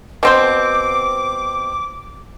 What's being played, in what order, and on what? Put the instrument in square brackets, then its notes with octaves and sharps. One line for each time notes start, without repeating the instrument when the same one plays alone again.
[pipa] B2 C4 C5 [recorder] D6